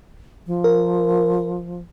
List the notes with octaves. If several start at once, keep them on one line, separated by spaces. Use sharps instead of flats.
F3
A#4